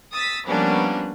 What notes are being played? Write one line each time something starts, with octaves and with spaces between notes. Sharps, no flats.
D#6 E6 A6 B6
F3 G3 A#3 B3 C#4 D4